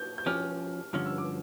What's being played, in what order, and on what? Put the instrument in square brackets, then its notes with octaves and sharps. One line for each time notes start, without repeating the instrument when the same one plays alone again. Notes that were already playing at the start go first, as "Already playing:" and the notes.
Already playing: [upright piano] G6
G6
[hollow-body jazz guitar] F3 C#4 G4 [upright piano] F6
[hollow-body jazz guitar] G2 D3 F3 C#4 [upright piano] F6
[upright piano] E6
D6